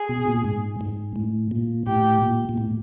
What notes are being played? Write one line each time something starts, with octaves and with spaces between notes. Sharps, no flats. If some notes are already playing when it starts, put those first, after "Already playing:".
Already playing: G#4
B2
A#2
G#2
G#2
A2
A#2
A2 G4
A#2
A#2
A2